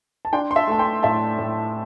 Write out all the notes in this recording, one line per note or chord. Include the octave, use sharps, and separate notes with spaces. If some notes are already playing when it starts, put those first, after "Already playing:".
A5
D4 G5 C6
C6
E5 A5
A3 A5
G5 C6
A2 E5 A5
A2